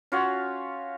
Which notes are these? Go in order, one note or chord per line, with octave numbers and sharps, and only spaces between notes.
C#4 F4 F#4 C#5